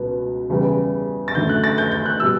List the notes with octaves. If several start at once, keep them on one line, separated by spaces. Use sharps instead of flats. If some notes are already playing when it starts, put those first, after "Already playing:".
Already playing: C#2 B2 F#3 B3
E2 C#3 E3 G3 B3
A6
F#2 D3 A3 G6
F#6
A6
G6
G6
F#6
B2 G3 E6